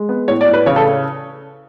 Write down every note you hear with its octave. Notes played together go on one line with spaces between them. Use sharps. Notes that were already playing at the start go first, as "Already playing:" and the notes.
Already playing: G#3
B3
A2 C#5
D5
A2
B4
C#3 C#5
A4